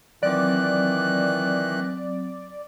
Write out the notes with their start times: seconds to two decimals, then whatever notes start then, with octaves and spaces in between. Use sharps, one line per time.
0.23 D#3 E3 F#3 C4 D5 F#6